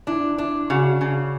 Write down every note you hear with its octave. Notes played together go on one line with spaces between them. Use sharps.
D4 E4
D4 E4
C#3 F#4
C#3